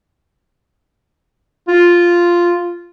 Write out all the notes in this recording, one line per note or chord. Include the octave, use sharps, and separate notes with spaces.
F4